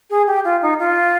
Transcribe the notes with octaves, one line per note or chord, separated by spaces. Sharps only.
G#4
G4
F4
D#4
F4